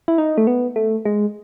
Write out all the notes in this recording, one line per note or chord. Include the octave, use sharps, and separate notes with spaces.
E4
D#4
A3
B3
A3
G#3